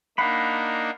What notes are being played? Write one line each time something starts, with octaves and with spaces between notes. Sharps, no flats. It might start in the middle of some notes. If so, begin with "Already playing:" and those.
A#3 D4 D#4 F5 F#5 B5